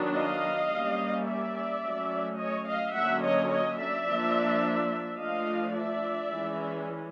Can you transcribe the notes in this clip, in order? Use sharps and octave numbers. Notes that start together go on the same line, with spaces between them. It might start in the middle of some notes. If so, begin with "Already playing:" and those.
Already playing: D#3 F#3 B3 D4
D#5 F5
G3 A#3 C#4
D5 E5
F#3 A3 C#4
C#5 D#5
D#5 F5
D3 F#3 A#3 C#4 E5 F#5
C#5 D#5
C#5 D#5
D5 E5
F3 A#3 D4
F3 A3 D4 D#5 F5
D5 E5
E3 G#3 C#4